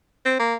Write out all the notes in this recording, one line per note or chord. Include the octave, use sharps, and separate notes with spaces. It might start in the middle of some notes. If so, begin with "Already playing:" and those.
C4
A#3